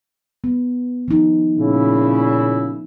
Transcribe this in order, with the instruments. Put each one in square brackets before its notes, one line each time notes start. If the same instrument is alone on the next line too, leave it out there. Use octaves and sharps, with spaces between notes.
[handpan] B3
F3 D#4
[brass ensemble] A#2 C#3 E4